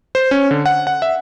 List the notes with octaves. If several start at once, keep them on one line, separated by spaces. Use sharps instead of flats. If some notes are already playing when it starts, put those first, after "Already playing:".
C5
C#4
D3
F#5
F#5
E5